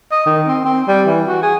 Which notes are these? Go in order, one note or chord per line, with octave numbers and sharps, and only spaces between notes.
D#5
D#3
C4
C4
G3
E3
F#4
G#4